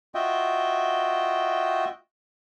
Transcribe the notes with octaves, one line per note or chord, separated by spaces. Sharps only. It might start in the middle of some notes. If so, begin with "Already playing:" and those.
F4 F#4 D#5 E5 G5